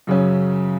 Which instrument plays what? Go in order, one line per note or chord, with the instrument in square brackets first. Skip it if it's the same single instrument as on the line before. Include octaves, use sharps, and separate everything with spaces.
[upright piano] F#2 C#3 F#3 C#4